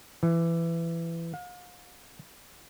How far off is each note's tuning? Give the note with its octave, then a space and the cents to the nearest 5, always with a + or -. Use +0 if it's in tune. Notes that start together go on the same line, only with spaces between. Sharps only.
E3 +20
F5 +40